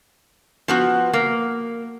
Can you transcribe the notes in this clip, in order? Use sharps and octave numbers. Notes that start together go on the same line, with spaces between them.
F3 B3 F#4
A#3